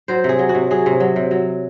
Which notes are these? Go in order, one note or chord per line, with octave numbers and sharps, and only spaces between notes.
F#3 C5
C3 G#4
F#3
F#4
C3
F#3 G#4
C3
F#3
C3
F#3